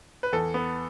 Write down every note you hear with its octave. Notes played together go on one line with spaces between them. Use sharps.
B4
E2 A4
B3